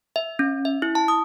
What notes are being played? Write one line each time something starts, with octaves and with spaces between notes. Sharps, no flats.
E5
C#4
E5
E4
A5
D#6